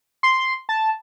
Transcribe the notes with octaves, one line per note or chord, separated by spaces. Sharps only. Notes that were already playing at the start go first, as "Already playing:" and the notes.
C6
A5